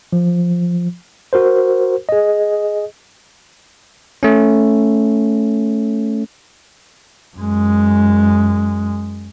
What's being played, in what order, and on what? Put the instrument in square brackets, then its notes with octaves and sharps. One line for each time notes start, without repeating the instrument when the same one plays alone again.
[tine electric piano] F3
F#4 A#4 C5
G#4 D#5
A3 C#4
[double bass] F#2 G#3